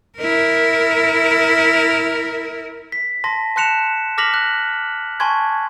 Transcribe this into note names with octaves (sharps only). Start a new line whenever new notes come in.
E4 A#4
B6
A5 C6 A#6
A5 C6 F#6 C#7 E7 F7
D6 F6 A#6 B6 F7 F#7
F#6
G#5 A5 C6 C#6 G#6